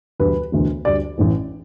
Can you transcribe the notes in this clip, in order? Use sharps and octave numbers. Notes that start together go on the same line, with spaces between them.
E1 D2 D3 G3 B4
E1 D2 D3 A3
D2 D3 G3 D5
A1 A2 E3